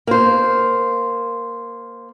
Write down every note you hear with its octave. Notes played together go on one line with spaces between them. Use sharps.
A#3 C5